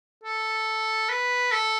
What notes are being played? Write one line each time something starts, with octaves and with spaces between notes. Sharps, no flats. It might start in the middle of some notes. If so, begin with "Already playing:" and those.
A4
B4
A4